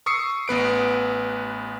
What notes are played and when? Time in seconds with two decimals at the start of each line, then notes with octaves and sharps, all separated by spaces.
0.06 C#6 D#6 E6 C7 C#7
0.48 A1 B3 B4 D7